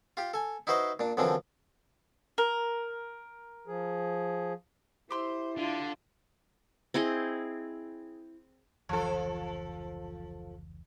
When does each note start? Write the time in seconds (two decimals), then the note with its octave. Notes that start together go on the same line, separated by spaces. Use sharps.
0.17 F4 G4
0.34 A4 G#5
0.67 D#4 E4 F#4 B4 C5 D#5
0.99 A#2 D4
1.17 F#2 D3 E3 F3 C4 D4
2.38 A#4
3.67 F3 G#4
5.11 E4 G4 C5 C6 E6
5.57 D3 F4
6.94 C4 E4 G#4 D#5
8.89 F1 C#2 E3 F3 A4